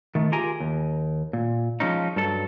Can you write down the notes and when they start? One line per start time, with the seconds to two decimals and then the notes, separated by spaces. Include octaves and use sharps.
0.15 D#3 A3
0.32 F4 G4 G#4 A#4 G#5 A#5
0.60 D#2
1.33 A#2
1.80 F3 G#3 C#4 D#4
2.16 G2 F#3 A4